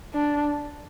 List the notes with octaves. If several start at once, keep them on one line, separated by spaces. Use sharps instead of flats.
D4